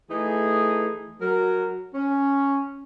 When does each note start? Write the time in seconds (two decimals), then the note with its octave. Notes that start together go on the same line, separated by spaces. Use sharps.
0.10 E3 A3 D#4 G#4
1.21 F#3 A#4
1.94 C#4